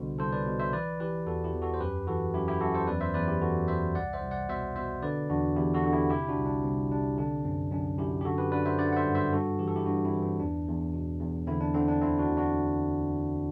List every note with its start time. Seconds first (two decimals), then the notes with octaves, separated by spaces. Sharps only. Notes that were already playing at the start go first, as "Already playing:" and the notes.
Already playing: C2 B2 D3 C5
0.19 C2 A4 C5
0.33 B4 D5
0.46 B2
0.60 C5 E5
0.73 E3 B4 D5
1.00 E3 G4 B4
1.26 E2 F#4 A4
1.44 E4 G4
1.53 E2
1.62 F#4 A4
1.74 C5
1.80 F#2 G4 B4
2.07 E3 F#4 A4
2.34 F#2 E4 G4
2.48 E4 G4
2.61 F#2 F#4 A4
2.74 A4 C5
2.87 E2 B4 D5
3.01 C5 E5
3.14 E2 B4 D5
3.28 E4 G4
3.41 E3 F#4 A4
3.68 E3 C5 E5
3.95 C2 D5 F#5
4.13 C5 E5
4.22 C2
4.31 D5 F#5
4.48 B2 C5 E5
4.76 B2 C5 E5
5.02 D3 B4 D5
5.30 E2 D4 F#4
5.56 E2 E4 G4
5.74 F#4 A4
5.83 D3
5.93 E4 G4
6.10 C3 E4 G4
6.28 D4 F#4
6.37 C2
6.46 D4
6.63 C2 C4
6.91 C3 D4
7.17 D3 D4
7.44 F#2 C4
7.71 F#2 D4
7.98 F#2 E4 G4
8.21 G4
8.25 D3 F#4 A4
8.38 G4 B4
8.52 D3 B4 D5
8.66 C5 E5
8.79 D3 D5 F#5
8.92 F#5
8.96 C5 E5
9.06 G2
9.15 C5 E5
9.32 G2 F#4 A4
9.59 E3 G4
9.68 A4
9.76 E4 G4
9.86 G2 D4 F#4
10.04 C4 E4
10.14 E3
10.22 C4
10.40 E2 D4
10.68 E2
10.94 B2
11.21 E2
11.47 D3 C4 E4
11.61 D4
11.74 D3 C4
11.88 D4
12.01 D2 C4 E4
12.19 D4 F#4
12.28 D2
12.37 D4 F#4